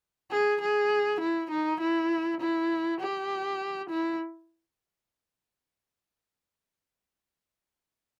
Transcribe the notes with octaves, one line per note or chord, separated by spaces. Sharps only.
G#4
G#4
E4
D#4
E4
E4
G4
E4